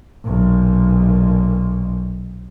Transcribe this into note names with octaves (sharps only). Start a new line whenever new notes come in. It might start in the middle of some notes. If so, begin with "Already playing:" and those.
B1 A#2